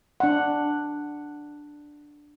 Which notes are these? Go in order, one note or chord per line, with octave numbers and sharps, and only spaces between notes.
D4 F#5